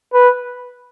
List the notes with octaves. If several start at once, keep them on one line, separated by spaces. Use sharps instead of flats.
B4